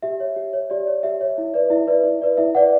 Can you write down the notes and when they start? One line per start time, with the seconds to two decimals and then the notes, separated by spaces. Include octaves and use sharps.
0.03 G4 E5
0.20 C#5
0.36 G4
0.53 C#5
0.70 G4 D5
0.87 C#5
1.03 G4 E5
1.21 C#5
1.38 E4
1.54 B4 D5
1.70 E4 E5
1.88 B4 D5
2.04 E4
2.22 B4 D5
2.37 E4 E5
2.55 B4 D5 F#5